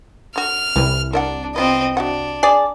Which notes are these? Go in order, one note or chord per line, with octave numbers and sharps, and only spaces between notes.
D3 F#4 F6
C2 E3 B4
D4 A#4 E5 F#5
B3 C4 F4 B4 D#5
D4 F#4 E5 F#5
G#4 D5